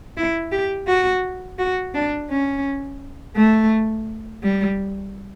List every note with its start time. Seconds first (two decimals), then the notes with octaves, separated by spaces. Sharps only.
0.17 E4
0.52 G4
0.87 F#4
1.59 F#4
1.95 D4
2.30 C#4
3.36 A3
4.43 G3